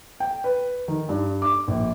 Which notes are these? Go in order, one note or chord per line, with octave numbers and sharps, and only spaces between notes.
G5
B4
D#3
G2
D6
A#1